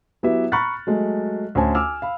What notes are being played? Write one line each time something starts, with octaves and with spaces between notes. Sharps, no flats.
F#3 B3 E4 G4 B4 E5
A#5 B5 C#6 F6 F#6 A6
F#3 G#3 A3
D2 C#4 C5 G#5 A5
G#5 D6 E6 F6
F5 B5